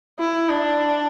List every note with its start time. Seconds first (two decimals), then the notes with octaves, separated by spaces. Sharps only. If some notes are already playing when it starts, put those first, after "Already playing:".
0.19 E4
0.50 D4